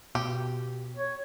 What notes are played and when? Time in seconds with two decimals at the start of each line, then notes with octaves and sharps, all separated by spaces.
0.15 B2 G4
0.96 C#5